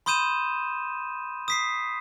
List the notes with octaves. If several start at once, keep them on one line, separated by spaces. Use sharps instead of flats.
B5 C6 D#6 G6 D#7 E7
D#6 B6 C7